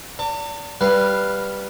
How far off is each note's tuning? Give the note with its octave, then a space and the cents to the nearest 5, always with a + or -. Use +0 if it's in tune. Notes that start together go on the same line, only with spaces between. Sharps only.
D5 -30 A5 +45
G3 +0 B4 +0 F5 +0